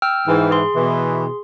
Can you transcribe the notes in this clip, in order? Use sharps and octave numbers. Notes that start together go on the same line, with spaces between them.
G5 E6 F6
G#2 E3
G#4 C6
B2 E3